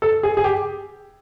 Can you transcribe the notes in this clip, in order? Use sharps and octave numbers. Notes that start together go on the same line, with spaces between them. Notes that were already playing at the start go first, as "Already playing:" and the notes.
A4
G#4
G#4
G4